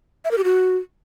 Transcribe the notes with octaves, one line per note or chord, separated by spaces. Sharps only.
E5
A#4
G4
F#4